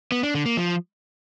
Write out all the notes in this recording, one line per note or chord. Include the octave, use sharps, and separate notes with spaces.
B3
D4
D3
A#3
F3